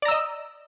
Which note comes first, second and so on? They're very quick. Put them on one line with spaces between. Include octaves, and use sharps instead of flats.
D5 A#5 E6 D#5